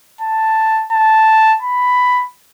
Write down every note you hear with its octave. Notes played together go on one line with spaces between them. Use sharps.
A5
A5
B5